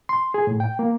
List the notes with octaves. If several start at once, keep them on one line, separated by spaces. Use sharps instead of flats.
C6
G#4
A2
G5
A#3